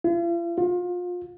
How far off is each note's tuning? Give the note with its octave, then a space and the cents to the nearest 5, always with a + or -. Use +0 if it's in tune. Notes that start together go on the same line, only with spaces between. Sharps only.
F4 -45
F4 +30